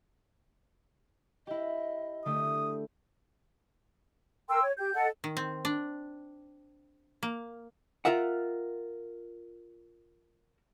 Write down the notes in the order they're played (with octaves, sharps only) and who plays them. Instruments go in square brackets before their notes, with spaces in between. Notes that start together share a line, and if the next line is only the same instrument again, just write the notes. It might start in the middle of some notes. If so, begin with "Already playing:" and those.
[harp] E4 G4 [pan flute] D#5
[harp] D3 A3 G4 [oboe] D#6
[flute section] A#4 G5 C6 E6
C#5
G4 G6
A4 D#5 F#5
[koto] D#3
C4
D4
A#3
[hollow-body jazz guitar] F4 A#4 E5 F#5